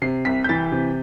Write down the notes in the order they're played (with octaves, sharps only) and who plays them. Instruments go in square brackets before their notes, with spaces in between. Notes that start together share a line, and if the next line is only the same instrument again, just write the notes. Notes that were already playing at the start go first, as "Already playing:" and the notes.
[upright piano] C3 C7
C2 B6
G6
E3 A6
C3